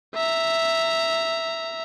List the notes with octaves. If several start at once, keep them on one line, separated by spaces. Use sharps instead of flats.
E5 A#5